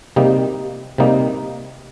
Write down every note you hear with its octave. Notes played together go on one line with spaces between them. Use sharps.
C3 G3 A#3 D#4
C3 G3 A#3 D#4